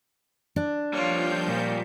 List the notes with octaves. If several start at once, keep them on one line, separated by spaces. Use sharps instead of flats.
D4
F3 G3 A#3 F4 C#5 G6
A#2